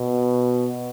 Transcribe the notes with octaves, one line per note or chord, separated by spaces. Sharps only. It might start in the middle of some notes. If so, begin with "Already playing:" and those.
Already playing: B2